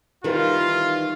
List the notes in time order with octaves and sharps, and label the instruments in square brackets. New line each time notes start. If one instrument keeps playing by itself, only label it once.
[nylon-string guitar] D#3 E3 G3 [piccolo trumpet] F4